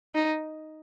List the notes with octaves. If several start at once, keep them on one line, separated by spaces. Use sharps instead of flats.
D#4